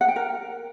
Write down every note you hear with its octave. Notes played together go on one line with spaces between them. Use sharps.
F#5
G5
A#4